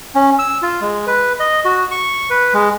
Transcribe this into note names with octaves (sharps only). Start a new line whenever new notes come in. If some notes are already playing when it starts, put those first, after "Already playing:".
C#4
E6
F4
G#3
B4
D#5
F#4
C#6
B4
G#3